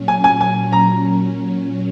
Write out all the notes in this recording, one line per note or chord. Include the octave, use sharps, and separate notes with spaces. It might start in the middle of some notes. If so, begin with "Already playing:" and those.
Already playing: A#2 F#3 C#4
G#5
G#5
G#5
A#5